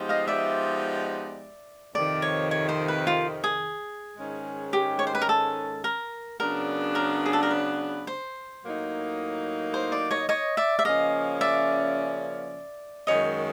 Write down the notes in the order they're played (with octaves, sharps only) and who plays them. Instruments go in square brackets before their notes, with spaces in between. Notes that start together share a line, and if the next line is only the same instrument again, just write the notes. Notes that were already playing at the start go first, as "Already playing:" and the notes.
Already playing: [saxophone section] F3 G#3 B3 D#4 G4
[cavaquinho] D#5 F5
D5 E5
[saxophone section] F2 C3 D#3 [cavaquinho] D5
[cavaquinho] C#5
C#5
C5
B4
F4
G#4
[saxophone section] G#2 D#3 G#3 C#4
[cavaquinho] G4
C#5
C5
B4
A#4
A4
A#4
[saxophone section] C#3 F#3 B3 D4 [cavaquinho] A#4
[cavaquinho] A#4
G#4
A4
A#4
B4
C5
[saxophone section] A2 F#3 A#3 D#4
[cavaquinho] C5
D5
C#5 D#5
C#5 D#5
D5 E5
E5
[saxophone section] C#3 F3 A#3 C#4 [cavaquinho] D#5 F5
[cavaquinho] D5 E5
[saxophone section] F#2 D#3 G#3 [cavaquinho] C#5 D#5